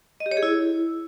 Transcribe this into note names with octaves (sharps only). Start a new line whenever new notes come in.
D#5
G4
C#5
G#4
E4